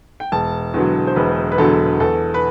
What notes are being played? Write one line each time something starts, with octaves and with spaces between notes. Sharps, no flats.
G5
E1 A5
E2 D3 F#3
C5
E1 B4
B4
E2 D3 F#3 A4
E2 A4
B4